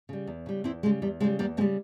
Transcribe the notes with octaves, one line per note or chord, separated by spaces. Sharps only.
C#3 G3
E2
C#3 G3
E2 C4 E4
C#3 G3 G#3
E2 G3
C#3 G3 G#3
E2 G3 A#3
C#3 G3 G#3 C4